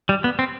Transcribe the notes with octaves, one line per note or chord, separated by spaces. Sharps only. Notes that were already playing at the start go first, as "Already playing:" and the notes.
G3
B3
C4